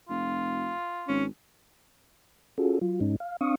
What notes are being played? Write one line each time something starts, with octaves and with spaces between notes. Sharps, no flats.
F1 F4
G#1 C#4
C#4 F4 F#4 G#4 A4
F#3 F4
G#2 G#3 C#4 D#4
F5
C4 D4 F5 C#6 D#6